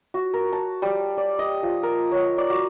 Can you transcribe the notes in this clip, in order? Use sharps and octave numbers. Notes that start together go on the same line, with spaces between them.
F#4
A#4
A5
G3
D5
D#5
F3
A#4
C#5
D5
F#4